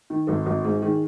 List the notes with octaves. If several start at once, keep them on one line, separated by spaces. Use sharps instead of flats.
D#3
G#1 A4
G#1
G#2 G#4
D#3 G#4